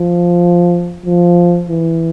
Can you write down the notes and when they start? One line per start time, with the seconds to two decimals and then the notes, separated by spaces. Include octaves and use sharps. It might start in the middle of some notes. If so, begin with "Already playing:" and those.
Already playing: F3
1.05 F3
1.69 E3